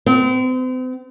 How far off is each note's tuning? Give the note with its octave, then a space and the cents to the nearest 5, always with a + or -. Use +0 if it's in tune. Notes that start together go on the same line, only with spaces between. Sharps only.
C4 -40